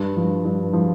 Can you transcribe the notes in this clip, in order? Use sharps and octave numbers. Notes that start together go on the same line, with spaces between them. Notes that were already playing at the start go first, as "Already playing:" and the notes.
Already playing: G2
F3
G2
F3